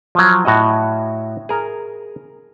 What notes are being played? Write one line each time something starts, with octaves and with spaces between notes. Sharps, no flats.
F3 F#3
A2 F#4 D#5
G#4 A#4